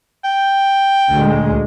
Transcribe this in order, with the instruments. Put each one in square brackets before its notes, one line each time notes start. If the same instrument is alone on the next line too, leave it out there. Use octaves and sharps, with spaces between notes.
[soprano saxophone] G5
[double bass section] D2 A#2 G#3